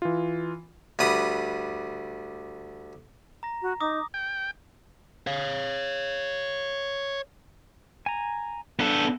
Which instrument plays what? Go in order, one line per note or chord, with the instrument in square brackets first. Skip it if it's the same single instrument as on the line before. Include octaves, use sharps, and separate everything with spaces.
[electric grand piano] E3 F4
[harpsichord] D2 G3 B4 D#6
[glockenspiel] A#5 A#6
[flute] F#4
[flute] D#4 [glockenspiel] D6 D#6 A#6
[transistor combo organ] G5
[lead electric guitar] C#5 F5
[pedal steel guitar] G#5 A#5
[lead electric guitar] B3 A4 [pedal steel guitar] D4